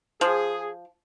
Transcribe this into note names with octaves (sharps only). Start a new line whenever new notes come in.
F3 G#4